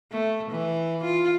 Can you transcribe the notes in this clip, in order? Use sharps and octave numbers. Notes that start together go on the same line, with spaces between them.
A3
E3
F4